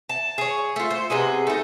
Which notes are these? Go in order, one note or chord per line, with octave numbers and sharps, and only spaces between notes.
A5
G#4 C#5
A3 F4
C5
C3 B3 G#4 D#5
A3 D#4